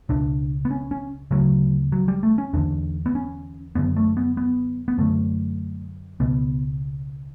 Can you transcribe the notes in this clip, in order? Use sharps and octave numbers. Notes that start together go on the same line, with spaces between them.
C#2 B2 D4
B3
C#4
C#4
D2 C#3 F#3
F#3
G3
A3
C#4
E2 D3 D4
B3
C#4
F#2 D3 B3
A3
B3
B3
B3
F#2 D3 A3
C#2 B2 B3